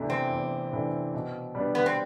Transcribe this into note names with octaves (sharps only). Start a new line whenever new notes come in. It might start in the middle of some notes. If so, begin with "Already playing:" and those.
Already playing: E2 C3 E3 A3 D4
C4
E2
C3 E3 A3 D4
B2
G3 B3 D4
B3
C4